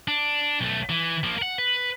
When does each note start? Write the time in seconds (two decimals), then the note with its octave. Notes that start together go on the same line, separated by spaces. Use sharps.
0.08 D4
0.61 B1 A3
0.90 E3
1.23 F3 A#3
1.38 A#4 F#5
1.58 B4